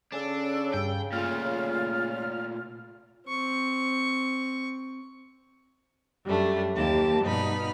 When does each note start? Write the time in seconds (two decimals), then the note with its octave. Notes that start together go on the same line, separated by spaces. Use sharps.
0.13 C#3 C#4 D4 A4
0.74 G2 G5
1.13 A#2 A3 F4 F6
3.28 C4 C#6
6.25 F#2 G3 A3 D4
6.76 D#2 A#3 G4 A5
7.23 G2 B2 D#4 B5 F6